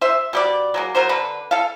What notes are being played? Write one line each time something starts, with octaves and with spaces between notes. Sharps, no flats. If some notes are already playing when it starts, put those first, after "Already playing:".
C5 E5
B2 G3 D5
F#3 G#3 A#3
F#3 A#4 C5
D3 B4
A4 F5